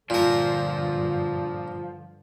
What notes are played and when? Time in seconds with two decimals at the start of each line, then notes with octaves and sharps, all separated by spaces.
0.10 G2 A#2 D3 F3 A#4